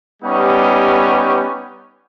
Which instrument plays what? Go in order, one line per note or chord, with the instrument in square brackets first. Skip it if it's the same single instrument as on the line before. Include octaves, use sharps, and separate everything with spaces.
[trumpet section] G3 B3 C#4 D#4 G4